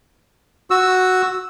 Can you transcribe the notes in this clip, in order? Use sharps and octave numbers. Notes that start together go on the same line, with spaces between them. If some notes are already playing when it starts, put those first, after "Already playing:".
F#4 E6